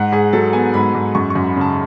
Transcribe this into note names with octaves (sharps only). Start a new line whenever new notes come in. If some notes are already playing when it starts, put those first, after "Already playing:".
Already playing: G#2 F#5
G#2 G#4
F#3 A4
B3 G#5
G#2 B5
G#2
F#2 C#6
C#6
F#2
B5
C#3 A5